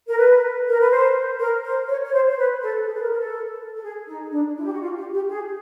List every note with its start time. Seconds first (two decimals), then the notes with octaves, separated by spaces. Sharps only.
0.08 A#4
0.18 B4
0.69 A#4
0.80 B4
0.91 C5
1.39 A#4
1.64 C5
1.88 C#5
2.05 C#5
2.13 C5
2.30 C5
2.37 B4
2.62 A4
2.86 G#4
2.94 B4
3.02 A#4
3.13 A#4
3.18 A4
3.76 A4
3.83 G#4
4.08 D#4
4.32 D4
4.57 E4
4.65 G4
4.72 F#4
4.81 F4
4.97 G4
5.13 G4
5.29 G#4